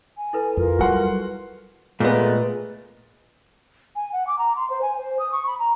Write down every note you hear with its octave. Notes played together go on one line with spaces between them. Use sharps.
G#5
E4 A4 B4
F2 F4 A#4
F#3 G3 F#4 F#5 C6
A#2 G#3 A3 B3 A#4
G#5
F#5
D6
A#5
C6
C5
G#5
C5
D#6
C#6
B5
A#5